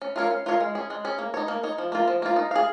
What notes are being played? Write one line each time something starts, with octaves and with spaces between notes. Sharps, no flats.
C#4
F4 A#4 C#5 F5
C#4
F4 A#4 C#5 F5
G#3
C#4 G#4
G#3
C#4 G#4
A#3
D#4 C#5
A#3
D#4 C#5
F3
A#3 F4
F3
A#3 F4
D#4
G#4 F5